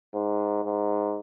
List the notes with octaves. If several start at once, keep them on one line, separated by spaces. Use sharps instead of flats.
G#2
G#2